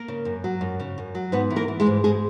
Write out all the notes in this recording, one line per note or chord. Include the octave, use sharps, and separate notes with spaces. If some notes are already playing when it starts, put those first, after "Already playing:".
Already playing: A#3 A#4
C#3
F#2
F#3
F#2
C#3
F#2
F#3
G#2 B3 B4
E3
A#3 A#4
E3
G#3 G#4
G#2
G#2 G#3 G#4